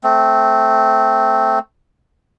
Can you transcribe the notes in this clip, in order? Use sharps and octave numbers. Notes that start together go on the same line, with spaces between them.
A3 C4